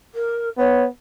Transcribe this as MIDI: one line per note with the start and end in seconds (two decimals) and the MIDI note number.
0.14 0.49 70
0.57 0.88 59
0.57 0.83 73